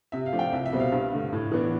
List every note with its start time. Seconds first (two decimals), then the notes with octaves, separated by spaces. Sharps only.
0.12 C3 E5
0.26 F5
0.33 F3 A3 D4
0.39 G5
0.52 C2 E5
0.66 E5
0.73 B2 G3 C4
0.80 F5
0.92 G2
1.13 D3 A3
1.33 A2
1.52 E3 B3 D4